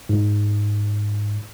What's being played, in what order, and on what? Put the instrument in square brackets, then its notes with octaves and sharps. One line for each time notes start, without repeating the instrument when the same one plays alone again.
[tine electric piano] G#2